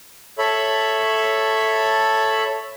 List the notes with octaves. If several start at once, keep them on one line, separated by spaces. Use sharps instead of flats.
A4 C#5 E5 B5